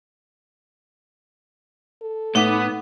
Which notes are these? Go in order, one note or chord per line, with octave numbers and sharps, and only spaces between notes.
A4
A2 B3 D#4 F#5 D6